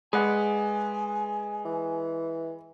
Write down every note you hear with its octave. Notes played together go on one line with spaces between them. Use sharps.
G#3 G#4 B4 D5 F#5 G#5 B5
E3